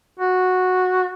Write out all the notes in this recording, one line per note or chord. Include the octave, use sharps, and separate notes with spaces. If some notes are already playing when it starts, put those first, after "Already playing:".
F#4